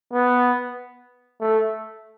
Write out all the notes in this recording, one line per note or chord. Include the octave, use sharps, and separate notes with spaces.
B3
A3